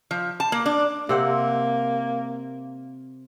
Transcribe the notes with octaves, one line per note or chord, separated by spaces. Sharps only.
F3
A5
A#3
D4
C3 A#3 C4 F#5